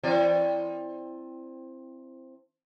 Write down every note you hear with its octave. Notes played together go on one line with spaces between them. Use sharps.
E3 C4 D5